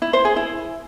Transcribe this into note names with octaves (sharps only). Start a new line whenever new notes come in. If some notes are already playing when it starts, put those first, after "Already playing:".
E4
C5
G#4
E4